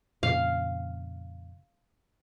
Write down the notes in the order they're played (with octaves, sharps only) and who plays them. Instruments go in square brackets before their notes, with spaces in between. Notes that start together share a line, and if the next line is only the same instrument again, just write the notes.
[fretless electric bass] F2 A#2 C#3 [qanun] F5